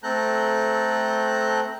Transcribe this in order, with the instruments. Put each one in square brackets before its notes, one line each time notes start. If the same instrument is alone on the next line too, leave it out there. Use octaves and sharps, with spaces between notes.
[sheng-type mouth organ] A3 C4 A4 A#5 F#6 G6